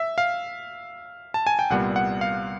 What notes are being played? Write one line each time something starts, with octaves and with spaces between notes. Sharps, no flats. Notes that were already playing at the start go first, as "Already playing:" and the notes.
Already playing: E5
F5
A5
G#5
G5
C2 A#2 G3 B3 F#5
F#5
F5